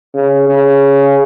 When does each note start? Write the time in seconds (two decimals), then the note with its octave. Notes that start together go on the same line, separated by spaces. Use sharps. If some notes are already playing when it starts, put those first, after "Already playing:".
0.14 C#3
0.48 C#3